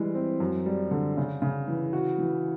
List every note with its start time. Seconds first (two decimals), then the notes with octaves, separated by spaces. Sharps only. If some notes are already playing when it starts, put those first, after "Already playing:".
Already playing: E3 G3 G#3
0.15 C4
0.40 F#2
0.66 G3
0.91 D3
1.17 C#3
1.42 C#3
1.68 E3
1.93 F#4
2.18 E3